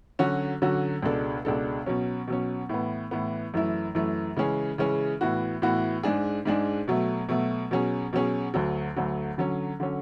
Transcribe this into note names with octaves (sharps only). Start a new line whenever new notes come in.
D3 F#3 C#4 F#4
D3 F#3 C#4 F#4
C#2 B2 G#3 D4 A4
C#2 B2 G#3 D4 A4
B2 F#3 C#4
B2 F#3 C#4
A2 E3 B3
A2 E3 B3
F#2 E3 A3 E4
F#2 E3 A3 E4
C#3 E3 G#3 C#4 G#4
C#3 E3 G#3 C#4 G#4
A2 E3 B3 F#4
A2 E3 B3 F#4
G#2 G#3 D4 G#4
G#2 G#3 D4 G#4
B2 F#3 A3
B2 F#3 A3
B2 F#3 C#4 G#4
B2 F#3 C#4 G#4
D2 D3 F#3
D2 D3 F#3
D3 F#3 C#4
D3 F#3 C#4